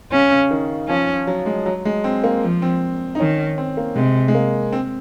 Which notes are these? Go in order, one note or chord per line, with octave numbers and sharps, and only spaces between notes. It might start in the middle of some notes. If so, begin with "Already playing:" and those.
C#3 C#4
C#3
D#3
F3 C#4
F#3
G#3
F#3
G#3
C4
A#3
F3
C4
D#4
D#3 C#4
C4
A#3
C3 G#3
G#3
A#3
C4